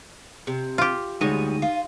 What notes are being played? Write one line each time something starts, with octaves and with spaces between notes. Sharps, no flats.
C3
F4 G4
D2 G3 G#3 D#4 C#5 D#7
F4